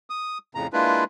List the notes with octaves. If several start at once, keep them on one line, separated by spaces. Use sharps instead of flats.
D#6
F2 A2 C#3 A#5
G#3 A#3 D4 E4 F4 B4